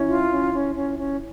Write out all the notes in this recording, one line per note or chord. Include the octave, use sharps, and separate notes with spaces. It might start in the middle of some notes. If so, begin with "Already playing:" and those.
Already playing: C#4 E4
F4
C#4
C#4
C#4
C#4